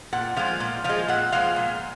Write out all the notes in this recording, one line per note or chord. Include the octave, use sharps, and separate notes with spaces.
A#2 F#5
F3 G#3 F5
A#2
F3 G#3 F5
A#2 F#5
F3 G#3 F5
A#2